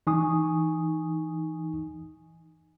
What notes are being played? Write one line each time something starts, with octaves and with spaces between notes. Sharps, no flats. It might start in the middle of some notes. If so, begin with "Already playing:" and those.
E3 D#4 G#5 C#6 D#6